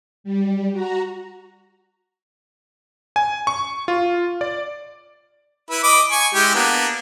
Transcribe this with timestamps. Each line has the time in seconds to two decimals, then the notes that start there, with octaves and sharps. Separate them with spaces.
0.24 G3
0.73 F#4 A#5
3.16 G#5
3.47 C#6
3.88 F4
4.41 D5
5.70 E4 B4
5.83 D#5 B5 D6
6.11 G#5 C#6
6.34 G#3 E4 G4
6.55 A#3 B3 D4